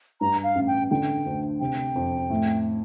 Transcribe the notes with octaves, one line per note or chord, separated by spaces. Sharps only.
G2 A#5
F5
A1
G5
D3 G5
D2
C3 G5
F2
A2